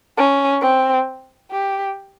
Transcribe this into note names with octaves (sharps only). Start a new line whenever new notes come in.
C#4
C4
G4